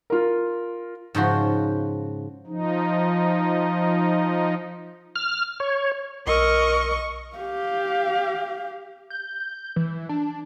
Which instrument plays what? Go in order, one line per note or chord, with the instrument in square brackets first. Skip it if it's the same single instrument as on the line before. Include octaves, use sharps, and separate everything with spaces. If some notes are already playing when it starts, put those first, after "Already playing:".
[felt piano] F4 A#4
[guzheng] G#2 C#3 F3 F#4
[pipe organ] F3 D#4
[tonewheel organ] F6
C#5
[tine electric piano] B1 E6 [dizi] A#4 [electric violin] D#5 [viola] C#6
[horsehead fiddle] G4 F5
[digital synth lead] G6
E3
D4